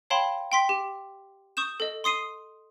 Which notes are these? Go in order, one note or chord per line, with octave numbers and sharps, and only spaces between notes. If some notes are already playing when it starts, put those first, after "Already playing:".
C#5 F5 G5 A5 B5 C6
G5 C6 B6
G4
C#6 D#6 G6 E7
A4 D#5
C6 D#6 C7 D#7